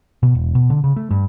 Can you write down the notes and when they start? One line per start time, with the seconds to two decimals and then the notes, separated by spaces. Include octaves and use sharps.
0.23 B2
0.35 E1
0.55 B2
0.70 D3
0.84 C#3
0.96 A3
1.11 G2